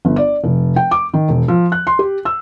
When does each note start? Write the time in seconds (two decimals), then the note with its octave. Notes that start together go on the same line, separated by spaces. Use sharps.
0.05 G1
0.16 D5
0.44 F1
0.76 G5
0.91 D6
1.14 D#3
1.29 E1
1.48 F3
1.72 F#6
1.87 C6
1.99 G4
2.25 E6